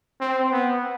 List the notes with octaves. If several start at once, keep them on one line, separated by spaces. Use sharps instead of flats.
C4
B3